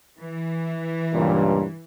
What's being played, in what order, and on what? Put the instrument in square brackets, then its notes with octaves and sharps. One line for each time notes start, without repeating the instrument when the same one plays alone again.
[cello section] E3
[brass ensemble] C#2 G2 A#2